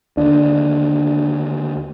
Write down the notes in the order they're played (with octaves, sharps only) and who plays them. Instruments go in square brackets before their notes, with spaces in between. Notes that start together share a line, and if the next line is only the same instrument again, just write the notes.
[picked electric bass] D#2 D3 [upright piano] D4